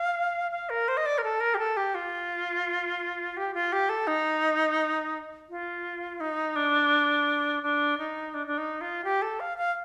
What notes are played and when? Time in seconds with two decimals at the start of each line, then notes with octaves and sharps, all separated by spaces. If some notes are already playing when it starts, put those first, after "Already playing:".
Already playing: F5
0.51 F5
0.70 A#4
0.88 C5
0.97 D#5
1.06 D5
1.18 A#4
1.24 A4
1.40 A#4
1.54 G4
1.58 A4
1.77 G4
1.95 F4
3.37 G4
3.54 F4
3.72 G4
3.89 A4
4.07 D#4
5.50 F4
6.20 D#4
6.56 D4
7.63 D4
7.98 D#4
8.34 D4
8.47 D4
8.58 D#4
8.81 F4
9.04 G4
9.22 A4
9.40 F5
9.58 F5